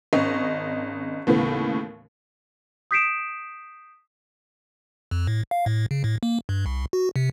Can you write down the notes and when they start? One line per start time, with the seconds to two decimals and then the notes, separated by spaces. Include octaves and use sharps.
0.13 G#1 C#4 D#5
1.27 D#2 A2 C#3 E3 B3
2.91 D#6 G6 B6 C7 D7 E7
5.11 F2
5.27 A2
5.51 F5
5.66 A2
5.91 C#3
6.04 A2
6.23 A#3
6.49 G2
6.66 C2
6.93 F#4
7.16 C3